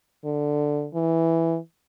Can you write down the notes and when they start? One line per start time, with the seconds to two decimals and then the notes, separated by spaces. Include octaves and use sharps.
0.24 D3
0.94 E3